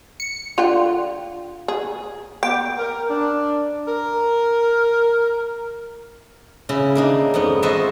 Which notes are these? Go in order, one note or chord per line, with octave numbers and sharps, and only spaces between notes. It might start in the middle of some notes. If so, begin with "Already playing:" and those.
C#7
D3 F4 G5
G#4
B3 G5 D6
A#4
D4
A#4
C#3 E4
A#3 D4 D#4
F2 G#2 B3
F3 E4 F#4 C5 D#5 E5